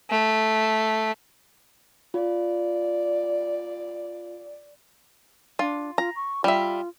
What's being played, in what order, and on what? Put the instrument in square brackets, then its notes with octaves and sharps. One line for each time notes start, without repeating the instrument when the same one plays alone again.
[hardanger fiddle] A3
[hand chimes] F4 [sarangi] D5
[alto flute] D4 [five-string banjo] F4
[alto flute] F4 [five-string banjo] A#5
[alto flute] C#6
[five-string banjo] G3 E5 [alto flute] F4